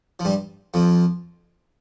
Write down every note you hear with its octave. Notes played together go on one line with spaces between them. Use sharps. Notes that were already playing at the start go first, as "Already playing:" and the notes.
F3
G2 G3
F2 F3